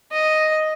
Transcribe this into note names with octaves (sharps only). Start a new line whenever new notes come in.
D#5